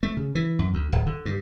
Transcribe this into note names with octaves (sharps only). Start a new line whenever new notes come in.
A3
C#3
E3
F#2
D2
D1
D3
G2